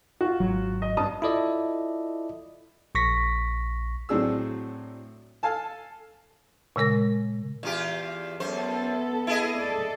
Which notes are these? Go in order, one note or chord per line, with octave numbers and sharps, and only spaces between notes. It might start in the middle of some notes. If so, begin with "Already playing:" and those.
F4 F#4
G#1 F#3
D#5
G2 A5 D#6
E4 F4 A4 D5 D#5
A#1 C#6 A#6 B6
A2 F#3 C4 D4 G#4 E6
A4 F5 G#5 A5
A#2 C#3 G#3 A#4 A#6
E2 F4 G4
F#2 B3 A4 C5
E4 G#4 D#5
A4 D5